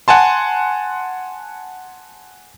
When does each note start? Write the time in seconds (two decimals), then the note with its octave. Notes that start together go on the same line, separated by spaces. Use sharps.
0.08 F#5 G#5 A5 C6